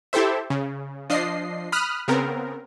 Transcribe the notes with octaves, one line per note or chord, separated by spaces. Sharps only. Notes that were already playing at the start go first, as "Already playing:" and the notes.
E4 G4 A4 C5 E5
C#3
F3 D4 D#5 C7
B5 D#6 F6 F#6
C#3 B3 C4 A#4